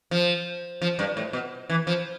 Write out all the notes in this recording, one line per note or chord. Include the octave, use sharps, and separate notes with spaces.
F3
F3
G2
A2
B2
E3
F3